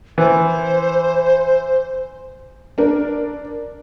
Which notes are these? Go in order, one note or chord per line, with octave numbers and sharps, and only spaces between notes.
E3 C5
D4 A#4